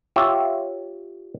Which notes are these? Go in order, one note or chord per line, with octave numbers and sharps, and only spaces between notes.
F4 G4 C#5 E5